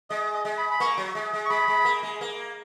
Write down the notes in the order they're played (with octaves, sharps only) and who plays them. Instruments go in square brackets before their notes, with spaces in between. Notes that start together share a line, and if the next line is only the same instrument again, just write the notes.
[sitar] G#3 [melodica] D#5
[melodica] D#5
[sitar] G#3
[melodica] B5
B5
[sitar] A#3 [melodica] C#6
[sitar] F#3
G#3
G#3
[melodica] C#6
[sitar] G#3 [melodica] B5
[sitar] G#3
A#3
G#3
A#3